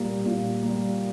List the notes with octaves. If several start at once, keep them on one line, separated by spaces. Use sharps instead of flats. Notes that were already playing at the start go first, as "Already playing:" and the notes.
Already playing: A#2 G3 A#3
A#2
G3 A#3